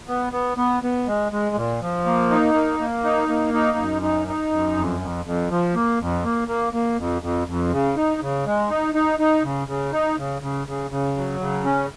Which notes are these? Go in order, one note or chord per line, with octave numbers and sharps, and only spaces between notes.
B3
B3
B3
B3
G#3
G#3
A#2
F3
A#3
D#4
A#3
A#3
D#4
A#3
D#4
F#2
D#4
D#4
F#2
F2
F2
F2
F3
A#3
F2
A#3
A#3
A#3
F2
F2
F2
C#3
D#4
C#3
G#3
D#4
D#4
D#4
C#3
C#3
D#4
C#3
C#3
C#3
C#3
F#3
C#3
C#4